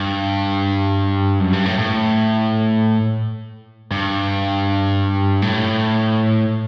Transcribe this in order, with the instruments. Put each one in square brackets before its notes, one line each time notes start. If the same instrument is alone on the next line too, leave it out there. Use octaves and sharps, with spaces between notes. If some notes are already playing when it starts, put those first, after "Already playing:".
Already playing: [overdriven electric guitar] G2
F#2
G2
A2
A2
G2
A2